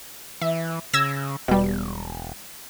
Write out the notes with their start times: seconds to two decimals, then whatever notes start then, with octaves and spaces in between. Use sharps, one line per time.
0.41 E3 E5
0.93 C#3 E6 G#6 A#6
1.48 E1 B2 G3